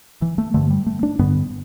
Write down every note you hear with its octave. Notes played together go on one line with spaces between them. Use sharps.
E3
A3
G2 D3 A3
G3
A3
D4
G2 D3 B3